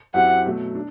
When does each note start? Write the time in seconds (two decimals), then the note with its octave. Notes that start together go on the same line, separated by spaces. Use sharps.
0.14 F#2 F#3 C4 E4 G4 F#5
0.45 B2 F#3 A3
0.75 D4